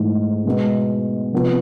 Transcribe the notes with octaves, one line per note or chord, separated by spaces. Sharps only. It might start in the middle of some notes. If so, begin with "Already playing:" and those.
Already playing: G#2 E3 A3
B2 G#3 B3
C3 F3 B3